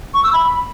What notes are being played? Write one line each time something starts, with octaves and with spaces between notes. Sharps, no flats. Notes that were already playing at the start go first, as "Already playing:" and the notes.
C#6
E6
B5